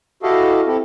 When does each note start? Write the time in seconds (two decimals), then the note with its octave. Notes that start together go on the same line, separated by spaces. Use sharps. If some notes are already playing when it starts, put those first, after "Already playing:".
0.23 E4 F#4 G4 A4 D#5 F5
0.67 C4 E4 G4 A4